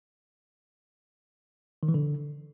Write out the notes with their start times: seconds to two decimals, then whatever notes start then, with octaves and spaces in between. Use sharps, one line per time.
1.83 D#3
1.88 E3
1.94 D3